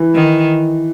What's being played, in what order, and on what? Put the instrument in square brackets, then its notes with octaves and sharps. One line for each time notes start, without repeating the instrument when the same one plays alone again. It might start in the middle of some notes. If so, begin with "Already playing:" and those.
Already playing: [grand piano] E3
[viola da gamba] D#3